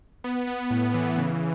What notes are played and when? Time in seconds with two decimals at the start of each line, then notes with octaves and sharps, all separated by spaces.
0.24 B3
0.47 B3
0.70 A2
0.94 E3
1.18 C#3